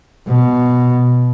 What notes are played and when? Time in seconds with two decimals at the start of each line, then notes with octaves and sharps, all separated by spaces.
0.28 B2